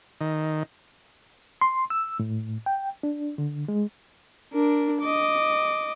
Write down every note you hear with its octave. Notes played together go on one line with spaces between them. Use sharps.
D#3
C6
E6
A2
G5
D4
D3
G#3
D4 A#4
D#5 D6